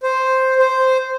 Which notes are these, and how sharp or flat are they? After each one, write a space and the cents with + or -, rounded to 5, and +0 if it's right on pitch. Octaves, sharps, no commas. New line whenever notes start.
C5 +0
C5 -5